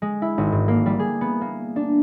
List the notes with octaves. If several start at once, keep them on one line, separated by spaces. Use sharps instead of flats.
G#3
E4
G#1
G#2
A#3
G3
G#4
B3
A#3
D4